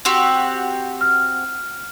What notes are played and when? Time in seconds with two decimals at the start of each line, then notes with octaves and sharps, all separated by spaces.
0.05 C4 F#4 G4
1.01 F6